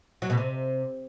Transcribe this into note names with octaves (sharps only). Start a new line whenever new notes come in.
F#3
B2
C3